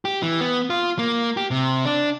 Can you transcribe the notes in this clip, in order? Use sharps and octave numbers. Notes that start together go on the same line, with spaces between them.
G4
E3
B3
F4
A#3
G4
C3
D4